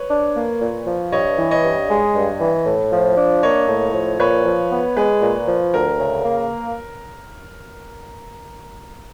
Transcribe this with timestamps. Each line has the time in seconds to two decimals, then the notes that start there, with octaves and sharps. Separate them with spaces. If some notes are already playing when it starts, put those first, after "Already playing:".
Already playing: B4 C#5
0.10 D4
0.36 A#3
0.61 A#2
0.86 F3
1.12 G2 C#5 D#5
1.38 E3
1.51 C#5 D#5
1.64 G2
1.90 G#3
2.15 G2
2.40 E3
2.66 A2
2.92 F3
3.17 D4
3.43 A#3 C#5 D#5
3.68 A2
3.94 F3
4.20 A#2 B4 C#5
4.45 F3
4.71 B3
4.97 G#3 B4
5.22 A#2
5.47 F3
5.74 D2 A#4
5.99 C#3
6.25 A#3